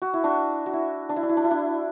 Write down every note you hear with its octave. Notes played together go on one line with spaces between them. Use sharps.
F#4
E4
D4 F#4
F#4
E4
D4
E4
D4
E4
D4
E4
D4